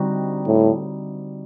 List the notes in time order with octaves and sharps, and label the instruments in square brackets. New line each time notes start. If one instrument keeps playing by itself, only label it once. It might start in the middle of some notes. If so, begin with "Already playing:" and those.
Already playing: [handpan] D3 G3 C4 D#4 F#4
[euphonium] A2